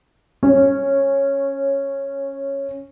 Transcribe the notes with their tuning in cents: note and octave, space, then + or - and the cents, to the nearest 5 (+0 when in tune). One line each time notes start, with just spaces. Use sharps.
C#4 -5 C#5 -20